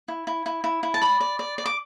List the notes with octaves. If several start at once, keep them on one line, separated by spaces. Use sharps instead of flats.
E4
E4
E4
E4
E4
A5
D5 B5
D5
D5
D5
D6